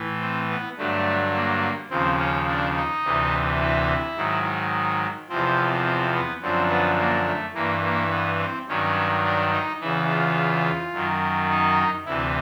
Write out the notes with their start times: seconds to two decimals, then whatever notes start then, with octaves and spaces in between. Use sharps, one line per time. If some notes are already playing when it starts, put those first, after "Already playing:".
Already playing: A2 E3
0.21 C4
0.50 B3
0.78 G2 D3 F#3 A3
1.34 A#3
1.90 D#2 C#3 F3 C4
2.19 C#4
2.47 D4
2.75 D#4
3.04 D2 C3 E3
3.60 E4
4.16 G#2 D#3 F#3
5.29 E2 C3 F3 C4
5.86 C4
6.14 B3
6.41 F#2 D3 F3 C4
6.70 B3
6.98 A#3
7.26 A3
7.54 G2 E3 A#3
7.84 A#3
8.11 B3
8.39 C4
8.67 G2 D#3 F#3 C#4
9.24 D4
9.52 D#4
9.80 E2 C#3 E3 E4
10.09 F4
10.93 F#2 D#3 F#3
11.50 D#4
12.05 D2 C3 E3 E4